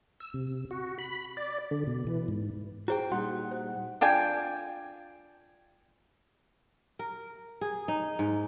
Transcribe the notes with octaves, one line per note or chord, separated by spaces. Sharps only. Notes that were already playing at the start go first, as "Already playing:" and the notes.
E6
C3
F#4
B5
D5
D3
B2
E3
G#2
E4 F#4 G#4 C5 G5
A#2 G3 D#4 F#4 F#5
C5
D4 F4 G5 G#5
A#4
G#4
D#4
G#2